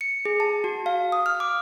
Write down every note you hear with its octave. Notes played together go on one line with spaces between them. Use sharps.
C#7
G#4
A5
F#4
F5
D#6
F6
D6